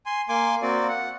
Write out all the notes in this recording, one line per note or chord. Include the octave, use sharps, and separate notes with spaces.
G#5 C6
A#3 G#5 C6 D6
A#3 C4 F#4 D5
F#5